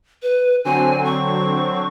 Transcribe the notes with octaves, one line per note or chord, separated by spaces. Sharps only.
B4
D3 F#3 C4 G#5
C#6